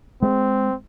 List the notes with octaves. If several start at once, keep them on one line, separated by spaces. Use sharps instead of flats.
G#3 C4